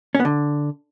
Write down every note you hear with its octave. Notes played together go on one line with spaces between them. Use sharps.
C#4
B3
D3